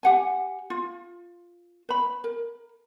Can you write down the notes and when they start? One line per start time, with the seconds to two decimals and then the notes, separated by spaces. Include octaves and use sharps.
0.03 G4 F#5 G#5
0.70 F4
1.89 B4 B5
2.24 A#4